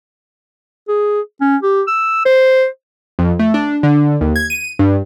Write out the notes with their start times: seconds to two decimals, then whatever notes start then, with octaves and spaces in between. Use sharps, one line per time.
0.88 G#4
1.41 C#4
1.63 G4
1.87 E6
2.25 C5
3.19 F2
3.39 A3
3.54 D4
3.83 D3
4.21 D#2
4.36 G#6
4.50 D#7
4.79 G2